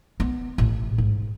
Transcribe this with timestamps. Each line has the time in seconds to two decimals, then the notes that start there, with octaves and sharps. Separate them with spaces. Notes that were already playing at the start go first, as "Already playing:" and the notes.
0.20 B3
0.58 A1
0.98 G#2